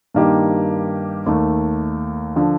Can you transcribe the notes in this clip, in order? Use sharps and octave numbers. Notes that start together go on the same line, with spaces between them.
G2 D#3 A#3 D#4 G4
D#2 D#3 A3
D3 F3